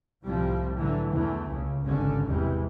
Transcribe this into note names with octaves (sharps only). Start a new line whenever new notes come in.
C2 A2 C3 F3 G3
A2 D3 E3 F#3
E2 E3 A3
C#2 C#3
G#1 C#2 G2 D3 C#4
E2 C3 G3 G#3